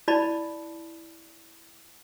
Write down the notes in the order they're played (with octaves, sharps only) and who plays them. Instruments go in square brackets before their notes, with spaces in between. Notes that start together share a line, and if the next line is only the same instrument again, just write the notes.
[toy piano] E4 D5 A5 B5